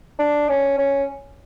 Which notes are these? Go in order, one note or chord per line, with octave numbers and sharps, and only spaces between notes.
D4
C#4
C#4